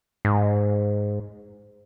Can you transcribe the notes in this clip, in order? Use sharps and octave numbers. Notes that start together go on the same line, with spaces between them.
G#2